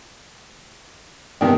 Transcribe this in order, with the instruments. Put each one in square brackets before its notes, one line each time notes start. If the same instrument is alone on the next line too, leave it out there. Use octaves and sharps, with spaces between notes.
[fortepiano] C3 D#3 D4 [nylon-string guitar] B3 F#5 G5